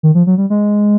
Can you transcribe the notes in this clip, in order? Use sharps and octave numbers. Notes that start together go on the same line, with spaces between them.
D#3
F3
F#3
G3
G#3